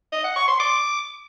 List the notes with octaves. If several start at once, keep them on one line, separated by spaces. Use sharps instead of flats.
D#5
F#5
C#6
C6
D6